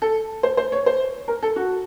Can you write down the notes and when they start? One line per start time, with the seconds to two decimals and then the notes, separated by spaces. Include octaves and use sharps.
0.02 A4
0.43 C5
0.57 C5
0.72 C#5
0.86 C5
1.28 A#4
1.43 A4
1.56 F#4